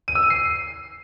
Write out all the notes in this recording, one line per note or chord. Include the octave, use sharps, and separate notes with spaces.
D#7
E6
D#7
C7